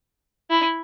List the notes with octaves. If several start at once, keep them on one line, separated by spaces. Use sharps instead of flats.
E4